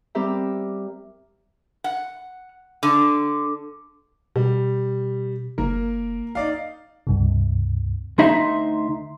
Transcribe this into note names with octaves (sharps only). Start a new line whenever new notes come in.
G3 C4 G4 A#4 E5
F#5
D3
B2 G3
F#1 A#3 A#4
D#4 D5 F5
C#2 G2 C3
D2 D#4 E5 C6